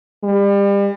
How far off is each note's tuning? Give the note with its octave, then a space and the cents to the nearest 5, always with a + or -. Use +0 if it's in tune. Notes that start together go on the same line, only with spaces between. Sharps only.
G3 +35